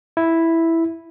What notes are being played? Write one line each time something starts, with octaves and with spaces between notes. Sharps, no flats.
E4